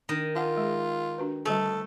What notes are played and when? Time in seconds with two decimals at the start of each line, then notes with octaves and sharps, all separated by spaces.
0.09 D#3 D4 D#5
0.36 F4 A#4 F#5
0.57 G#3 G#4
1.18 D4 F#4 B4
1.45 D3 G3 A3 A4